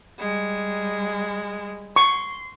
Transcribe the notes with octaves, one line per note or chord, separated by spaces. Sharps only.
G3 G#3
C6 C#6